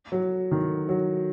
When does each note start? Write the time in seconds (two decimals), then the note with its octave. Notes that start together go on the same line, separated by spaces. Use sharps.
0.12 F#3
0.51 D#3
0.89 F#3